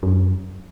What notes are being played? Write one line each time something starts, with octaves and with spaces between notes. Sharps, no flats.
F#2